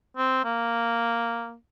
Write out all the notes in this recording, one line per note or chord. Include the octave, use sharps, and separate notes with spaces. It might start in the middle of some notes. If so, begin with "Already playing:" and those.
C4
A#3